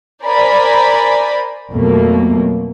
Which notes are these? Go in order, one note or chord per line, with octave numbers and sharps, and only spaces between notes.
A#4 C5 D5 G#5 B5
F2 B2 F#3 A3 A#3